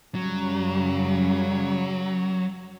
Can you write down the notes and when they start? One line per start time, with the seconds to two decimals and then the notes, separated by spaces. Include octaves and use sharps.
0.15 F#2 C#3 F#3 G3